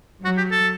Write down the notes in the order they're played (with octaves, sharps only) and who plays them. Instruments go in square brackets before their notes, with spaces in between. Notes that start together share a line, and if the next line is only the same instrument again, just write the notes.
[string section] F#3 [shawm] F#4
[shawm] G4
A4